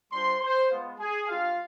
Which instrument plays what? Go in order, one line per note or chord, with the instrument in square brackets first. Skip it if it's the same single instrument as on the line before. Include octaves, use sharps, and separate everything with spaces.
[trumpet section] G3 D4 F4 C5 C6
C5 C6
G#3 B3 F4
G#4 G#5
G#3 D4 F4 G4 F5